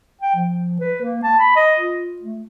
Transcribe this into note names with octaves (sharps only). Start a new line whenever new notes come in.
G5
F3
B4
A#3
A5
B5
D#5
F4
A3